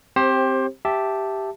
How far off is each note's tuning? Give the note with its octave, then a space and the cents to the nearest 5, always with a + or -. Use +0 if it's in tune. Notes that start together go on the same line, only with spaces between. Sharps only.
C4 +0 G4 +0 C5 +25
G4 +0 E5 +0 A5 +0